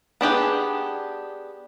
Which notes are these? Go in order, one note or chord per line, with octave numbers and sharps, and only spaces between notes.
B3 D4 G4 G#4